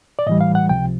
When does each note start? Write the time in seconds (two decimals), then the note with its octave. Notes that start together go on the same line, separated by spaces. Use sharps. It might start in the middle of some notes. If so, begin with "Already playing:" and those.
0.19 D5
0.27 A2 E3 G3 D#5
0.41 F5
0.55 F#5
0.69 C#2 C3 F3 G5